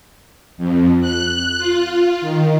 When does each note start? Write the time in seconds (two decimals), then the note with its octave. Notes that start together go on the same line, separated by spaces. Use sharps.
0.58 F2
1.01 F#6
1.58 F4
2.21 D#3